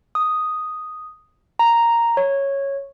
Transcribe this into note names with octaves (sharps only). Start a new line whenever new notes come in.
D#6
A#5
C#5